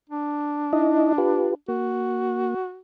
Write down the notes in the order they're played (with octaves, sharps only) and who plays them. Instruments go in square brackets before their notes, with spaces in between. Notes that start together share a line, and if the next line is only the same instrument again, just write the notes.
[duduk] D4
[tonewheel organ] D#4 E4 D#5
F4 G4 B4
[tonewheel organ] A#3 [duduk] F#4